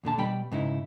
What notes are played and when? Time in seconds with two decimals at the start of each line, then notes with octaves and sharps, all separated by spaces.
0.04 E2 A#2 D3 A5
0.18 B2 G3 G5 B5
0.52 G#2 C#3 D#4 E4